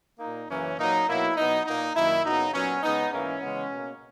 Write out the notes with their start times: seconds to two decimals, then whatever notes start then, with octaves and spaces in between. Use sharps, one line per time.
0.20 A#2 A#3 D#4
0.49 F#2 C#3 E3 A#3 C#4
0.78 A#2 F#3 A#3 D#4
1.07 B2 F#3 A#3 E4
1.37 B2 F#3 B3 D#4
1.66 A#2 A#3 D#4
1.95 F#2 D#3 A#3 E4
2.24 F#2 C#3 F#3 B3 D#4
2.53 A#2 F#3 B3 C#4
2.83 C#3 G#3 B3 D#4
3.12 G#2 E3 A#3 C#4
3.41 C#3 E3 G#3 B3
3.71 B2 A#3